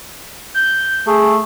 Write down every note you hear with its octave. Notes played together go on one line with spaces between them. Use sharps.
G6
A3 G#4